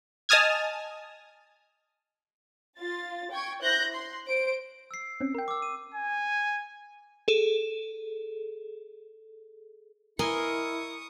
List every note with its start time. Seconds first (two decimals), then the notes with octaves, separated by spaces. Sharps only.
0.29 D#5 G#5 A5 D#6 F6 G#6
2.77 F4 A6
3.31 G5 C#6 G#6
3.61 E4 C5 F#6 G6 A#6
3.94 C6
4.25 C5 D7
4.91 E6 C7
5.21 C4 C#4
5.35 A#4 G5
5.48 D6 E6
5.62 D#7
5.95 G#5
7.28 G#4 A4
10.19 E4 A#4 D#5 G#5 C6 C#6 D#6